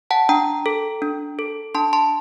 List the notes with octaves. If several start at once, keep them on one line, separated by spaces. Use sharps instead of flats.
F#5 A5
D4 G5 A#5
A4
D4
A4
D4 A5 C6
A5 C6